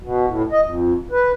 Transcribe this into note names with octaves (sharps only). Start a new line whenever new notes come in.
B2
A2
D#5
F2
B4